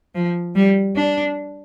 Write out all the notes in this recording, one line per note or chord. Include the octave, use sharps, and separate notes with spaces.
F3
G3
D4